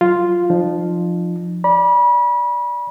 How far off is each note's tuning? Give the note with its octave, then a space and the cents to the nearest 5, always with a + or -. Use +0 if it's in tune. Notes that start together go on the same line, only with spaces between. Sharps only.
F#3 +0 F4 +0
F3 +0 D#4 -40
D5 +0 B5 -35